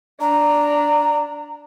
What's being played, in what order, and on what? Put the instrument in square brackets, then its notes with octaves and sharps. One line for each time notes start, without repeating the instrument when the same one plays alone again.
[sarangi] D4 [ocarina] A#5